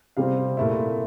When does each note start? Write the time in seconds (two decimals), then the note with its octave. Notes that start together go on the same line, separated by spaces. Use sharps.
0.17 C3 G3 C4 F5
0.57 A#2 A3 E4